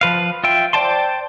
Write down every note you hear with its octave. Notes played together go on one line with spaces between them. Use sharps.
F3 B4 F5
F4 E5 G5
C5 D5 G5 A5 C6